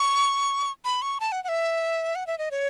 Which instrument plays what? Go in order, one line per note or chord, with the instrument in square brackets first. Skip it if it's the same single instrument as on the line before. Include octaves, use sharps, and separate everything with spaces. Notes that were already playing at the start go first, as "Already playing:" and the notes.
Already playing: [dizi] C#6
B5
C#6
A5
F#5
F#5
E5
F#5
E5
D#5
C#5